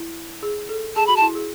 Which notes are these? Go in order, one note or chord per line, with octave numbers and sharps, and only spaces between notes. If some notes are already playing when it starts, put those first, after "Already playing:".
Already playing: E4
G#4
A4
G#4 A5
F#4 B5
A5
E4
G#4